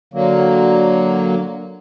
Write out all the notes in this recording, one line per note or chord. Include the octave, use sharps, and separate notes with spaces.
D3 F#3 A#3